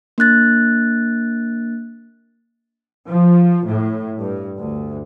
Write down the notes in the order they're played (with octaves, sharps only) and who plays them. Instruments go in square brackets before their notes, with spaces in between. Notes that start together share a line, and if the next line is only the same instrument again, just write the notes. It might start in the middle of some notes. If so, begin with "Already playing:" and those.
[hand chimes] A#3 D4 F#6 A6
[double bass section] F3
A2
G2
D2